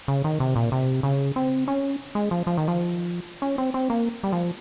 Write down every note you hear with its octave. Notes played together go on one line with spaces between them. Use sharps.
C#3
D#3
C3
A#2
C3
C#3
C4
C#4
G#3
F3
F3
D#3
F3
C#4
C4
C4
A#3
G3
F3